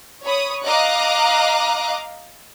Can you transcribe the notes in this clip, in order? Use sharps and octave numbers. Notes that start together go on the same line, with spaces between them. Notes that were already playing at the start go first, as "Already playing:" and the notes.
C#5 B5 D#6
D#5 F5 A#5 D6 F#6